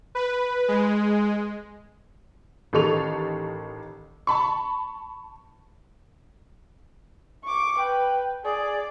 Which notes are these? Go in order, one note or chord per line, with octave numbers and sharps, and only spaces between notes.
B4
G#3
A1 D#3 G4 A4 C#6 F7
A5 B5 C#6
C#6 D6
B4 G5
G#4 D5